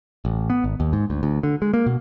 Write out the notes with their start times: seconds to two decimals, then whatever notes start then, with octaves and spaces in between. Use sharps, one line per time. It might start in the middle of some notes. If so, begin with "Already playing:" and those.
0.25 A1
0.50 B3
0.64 G#1
0.80 D#2
0.93 G#2
1.10 D2
1.23 D2
1.43 D3
1.62 G#3
1.74 A#3
1.86 B2